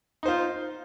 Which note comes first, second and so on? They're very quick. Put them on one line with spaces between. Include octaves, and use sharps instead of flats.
D#4 C5 F4